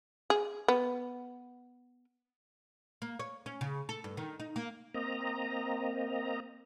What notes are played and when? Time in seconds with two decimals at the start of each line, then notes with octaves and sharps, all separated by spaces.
0.30 G#4
0.68 B3
3.02 A#3
3.19 C#5
3.46 C#4
3.61 C#3
3.89 A4
4.04 G2
4.17 D#3
4.40 D#4
4.56 A#3
4.94 A#3 C4 D#5 A#5